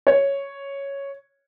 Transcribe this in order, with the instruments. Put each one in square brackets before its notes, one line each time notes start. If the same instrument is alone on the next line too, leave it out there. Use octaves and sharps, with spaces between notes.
[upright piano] C#5